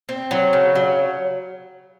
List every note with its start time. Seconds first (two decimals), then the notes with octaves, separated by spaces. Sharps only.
0.09 C4
0.31 F#3
0.53 C#3
0.75 F#3